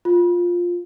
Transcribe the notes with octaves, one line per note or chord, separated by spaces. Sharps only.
F4